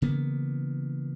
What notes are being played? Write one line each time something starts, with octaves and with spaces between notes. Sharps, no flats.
C#3 E3 A#3 B3